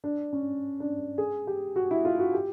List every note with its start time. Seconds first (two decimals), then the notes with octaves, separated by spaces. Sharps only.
0.04 D4
0.33 C#4
0.80 D4
1.18 G#4
1.47 G4
1.76 F#4
1.91 E4
2.05 F4
2.19 F#4
2.34 G4